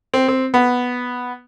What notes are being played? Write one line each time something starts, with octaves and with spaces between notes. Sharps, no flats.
C4
C4
B3